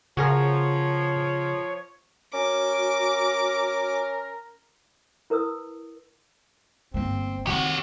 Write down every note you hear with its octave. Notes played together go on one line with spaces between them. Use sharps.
C#3 F3 F#4 G#4 A#4 C#5
C#4 F#4 A#4 D6
E4 A#4 B4 D#6 E6
G1 A#3 C4
D#3 C4 F#4 G4 C#5